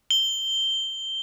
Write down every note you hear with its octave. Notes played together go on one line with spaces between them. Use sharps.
G7